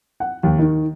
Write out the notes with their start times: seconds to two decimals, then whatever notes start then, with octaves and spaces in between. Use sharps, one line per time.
0.20 F#5
0.43 D#2
0.59 D#3